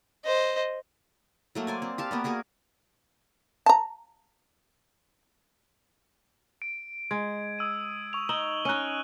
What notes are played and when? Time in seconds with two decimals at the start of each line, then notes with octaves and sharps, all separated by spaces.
0.24 C5 D#5
1.55 F#3 A3 A#3
1.67 C5 D5 G#5
1.82 C4
1.98 G4 F5 A5
2.11 A#3 B3 D5
2.24 A#3 F#4 G#4 A#4
3.66 A5 A#5
6.62 D7
7.11 G#3 G#6
7.59 D#6 E6 D#7
8.13 C#6 F7
8.29 D#4 E7 F#7 G7
8.65 C#4 D#4 F#6 D#7